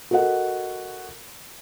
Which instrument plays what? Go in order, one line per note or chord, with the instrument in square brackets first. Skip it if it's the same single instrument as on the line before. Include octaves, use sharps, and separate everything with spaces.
[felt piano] F#4 A4 A#4 D#5 F#5